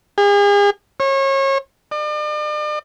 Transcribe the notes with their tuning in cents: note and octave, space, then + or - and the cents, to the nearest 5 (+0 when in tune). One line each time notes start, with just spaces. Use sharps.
G#4 -40
C#5 -30
D5 +45